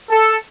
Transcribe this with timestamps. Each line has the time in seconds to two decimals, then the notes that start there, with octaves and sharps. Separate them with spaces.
0.10 A4